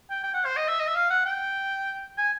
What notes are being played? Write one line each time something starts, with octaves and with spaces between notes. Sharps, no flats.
G5
G5
F#5
C5
D#5
E5
D#5
E5
F5
F#5
G5
G#5